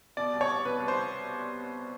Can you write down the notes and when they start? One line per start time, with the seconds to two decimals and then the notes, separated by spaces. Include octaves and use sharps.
0.17 B2 D5
0.33 C2
0.41 C#5
0.49 C2
0.65 B2 B4
0.80 C2
0.88 C5